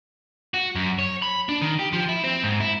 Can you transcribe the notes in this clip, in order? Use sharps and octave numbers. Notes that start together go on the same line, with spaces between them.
F#4
F#2
C#5
B5
D4
D#3
G4
F3
E4
C4
G#2
E4